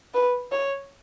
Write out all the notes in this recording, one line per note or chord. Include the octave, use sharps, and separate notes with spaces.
B4
C#5